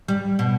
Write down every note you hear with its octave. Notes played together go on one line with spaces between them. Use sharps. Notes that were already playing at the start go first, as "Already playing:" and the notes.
G3
B2